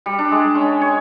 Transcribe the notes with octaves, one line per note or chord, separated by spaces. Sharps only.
G3
D4
G#3
C#4
C#5